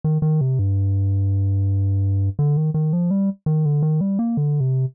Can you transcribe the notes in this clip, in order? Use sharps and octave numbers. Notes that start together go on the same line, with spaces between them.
D#3
D#3
C3
G2
D3
D#3
D#3
F3
G3
D#3
D3
D#3
G3
A#3
D3
C3